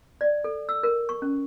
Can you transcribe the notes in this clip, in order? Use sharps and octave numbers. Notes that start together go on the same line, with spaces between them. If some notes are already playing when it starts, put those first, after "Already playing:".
D5
A4
E6
A#4
C#6
C#4